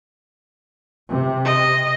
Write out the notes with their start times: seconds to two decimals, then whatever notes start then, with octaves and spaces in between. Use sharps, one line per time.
1.09 C3
1.45 D#5